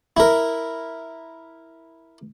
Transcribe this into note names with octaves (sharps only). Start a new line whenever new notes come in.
E4 A#4